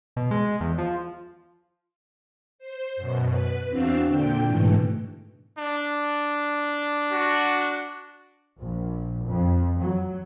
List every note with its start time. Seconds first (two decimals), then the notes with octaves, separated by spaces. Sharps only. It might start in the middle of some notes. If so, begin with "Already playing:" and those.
0.16 B2
0.31 G#3
0.60 E2
0.78 F3
2.59 C5
2.96 F#2 B2
3.30 B4
3.68 E2 C4 D4 F#4 F5 E6
4.06 A#2 D3 G5
4.45 G#2 B2 D3 E3 A3
5.58 D4
7.12 F#4
8.61 A#1
9.28 F2
9.81 F#3